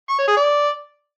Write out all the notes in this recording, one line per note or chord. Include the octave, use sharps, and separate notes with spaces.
C#6
C#5
G#4
D5